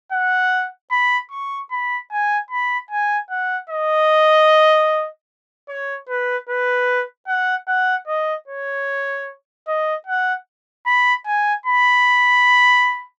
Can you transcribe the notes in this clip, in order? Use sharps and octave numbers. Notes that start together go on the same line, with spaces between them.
F#5
B5
C#6
B5
G#5
B5
G#5
F#5
D#5
C#5
B4
B4
F#5
F#5
D#5
C#5
D#5
F#5
B5
G#5
B5